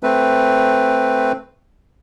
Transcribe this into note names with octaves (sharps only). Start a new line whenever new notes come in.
A3 C4 B4